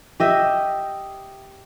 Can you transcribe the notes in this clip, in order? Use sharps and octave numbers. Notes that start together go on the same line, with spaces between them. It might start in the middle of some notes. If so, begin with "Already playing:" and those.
G4 D#5 E5